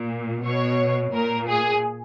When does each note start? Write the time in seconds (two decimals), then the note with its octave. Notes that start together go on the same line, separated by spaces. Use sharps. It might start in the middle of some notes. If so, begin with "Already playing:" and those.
Already playing: A#2
0.44 B2 C#5
1.13 A#2 A#4
1.47 G#4